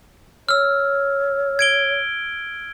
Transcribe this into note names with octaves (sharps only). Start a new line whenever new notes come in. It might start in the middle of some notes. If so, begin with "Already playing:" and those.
C#5 E6 F6
G#6 D7 G7